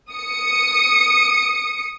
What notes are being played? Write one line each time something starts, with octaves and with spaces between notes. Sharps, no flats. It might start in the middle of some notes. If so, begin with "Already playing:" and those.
D#6 C#7